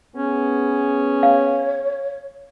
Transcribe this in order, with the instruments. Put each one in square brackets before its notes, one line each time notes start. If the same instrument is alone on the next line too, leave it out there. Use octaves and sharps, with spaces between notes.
[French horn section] B3 G#4 [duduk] C#4
[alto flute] C#5 [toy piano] F5